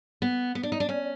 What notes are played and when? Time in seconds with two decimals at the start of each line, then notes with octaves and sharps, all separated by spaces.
0.22 B3
0.55 B3
0.63 D4
0.72 D#4
0.80 D4
0.89 C#4